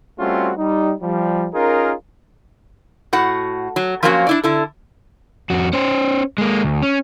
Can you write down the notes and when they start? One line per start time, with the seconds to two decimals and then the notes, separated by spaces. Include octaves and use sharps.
0.18 G3 A3 C4 C#4 F4 F#4
0.58 G3 D#4
1.01 F3 G3
1.53 C#4 D#4 F4 G#4 A#4
3.13 A2 F#4 F#5
3.76 F#3
4.03 F3 F#3 A#3 C4 C#4 F#4
4.27 D4 E4 D5
4.43 D3 E4 A4
5.50 F2 F#4
5.73 C#4 C5
6.38 G#3 A#3
6.64 D2
6.82 C#4